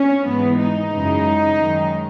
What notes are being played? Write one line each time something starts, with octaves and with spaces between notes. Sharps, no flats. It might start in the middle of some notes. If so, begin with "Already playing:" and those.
Already playing: C#4
G#2 E3 G#3 B3
D#4
F#2 C#3 E3 G#3
F#2 D#3 G#3